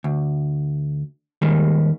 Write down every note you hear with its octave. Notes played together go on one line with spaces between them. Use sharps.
D2
D#2 D#3 G3 G#3